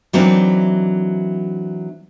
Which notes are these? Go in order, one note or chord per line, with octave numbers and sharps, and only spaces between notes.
E3 F#3 A#3 C4 D4 D#4